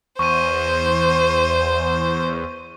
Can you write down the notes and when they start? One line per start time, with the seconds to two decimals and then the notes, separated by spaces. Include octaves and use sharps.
0.19 E2 C5 C#6 D#7